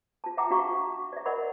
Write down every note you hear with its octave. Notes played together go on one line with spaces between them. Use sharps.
F4 A5
E5 F#5 G5 A#5 D6
D4 F#4 F5 A#5 C#6
D5 E5
A#4 D5 D#5 F#5 B5